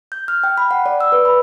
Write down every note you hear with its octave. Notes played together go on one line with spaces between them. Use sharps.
G6
F6
G5
B5
F#5
D5
E6
B4
B5